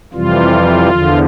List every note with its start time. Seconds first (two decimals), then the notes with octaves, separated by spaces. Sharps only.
0.13 F2 C3 E3 G3 F4
0.88 E2 D3 F3